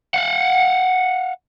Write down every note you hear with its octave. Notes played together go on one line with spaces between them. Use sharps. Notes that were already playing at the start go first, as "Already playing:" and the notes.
F5 F#5